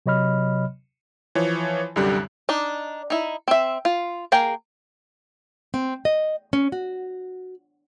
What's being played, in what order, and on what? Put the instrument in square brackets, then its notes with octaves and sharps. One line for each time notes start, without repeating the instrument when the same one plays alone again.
[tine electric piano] C3 F#3 C#5 D#5 B5 F6
[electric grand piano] E3 F3 C#5
C2 F#2 D3 G3 G4 F#6
[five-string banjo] D4 D#4
D#4 E4
C4 E5
F4
A#3 G#4 A#4 G5
[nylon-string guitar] C4
D#5
C#4
F#4